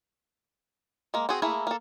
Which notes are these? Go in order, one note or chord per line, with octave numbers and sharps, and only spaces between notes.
G#3 A#3
C4 F#4 G#4
A3 A#3 E4 G#4
A#3 A4